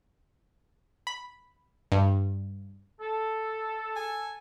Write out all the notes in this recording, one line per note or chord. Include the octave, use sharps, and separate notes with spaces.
B5
G2
A4
G#5